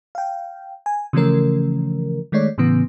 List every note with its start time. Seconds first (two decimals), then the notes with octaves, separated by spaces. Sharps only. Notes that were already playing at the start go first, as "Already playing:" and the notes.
0.15 F5 G5
0.86 G#5
1.13 C#3 E3 F3 A3 C#4 A#4
2.32 D#3 G#3 A3 C#5 D5
2.58 A2 C#3 E3 B3